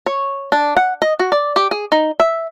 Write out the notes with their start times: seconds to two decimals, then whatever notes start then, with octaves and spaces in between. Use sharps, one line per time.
0.06 C#5
0.52 D4
0.76 F#5
1.02 D#5
1.19 F#4
1.32 D5
1.56 G4
1.71 G#4
1.92 D#4
2.20 E5